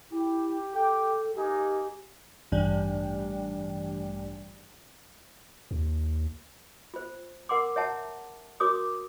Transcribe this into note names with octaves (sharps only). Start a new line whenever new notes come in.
E4 G4
G4 A4 G5
A#3 D#4 G4 G#5
A1 G2 G3
D#2
F4 C5
A#4 F#5 C6 D6
C#5 E5 F#5 A5 A#5
F#4 A#4 C#5 D6 D#6